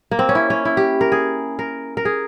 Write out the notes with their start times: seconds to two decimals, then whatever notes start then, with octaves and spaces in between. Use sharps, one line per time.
0.11 A#3
0.19 C4
0.29 C#4
0.35 E4
0.50 C#4
0.65 E4
0.77 G4
1.01 A#4
1.12 G#4
1.59 A#4
1.97 A#4
2.05 G#4